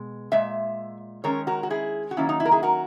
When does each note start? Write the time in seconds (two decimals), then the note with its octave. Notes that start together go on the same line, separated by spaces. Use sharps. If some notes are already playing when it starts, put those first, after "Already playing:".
Already playing: B2 G#3
0.32 A#2 G#3 E5
1.24 D#3 G#3 C#4 A#4 C#5
1.47 F#4 A#4
1.63 F#4
1.70 E4 G#4
2.11 F#4
2.17 D#3 F#3 A#3 C#4 E4
2.29 D#4
2.40 E4
2.45 A#4
2.51 E4 G#4
2.63 F#4 A#4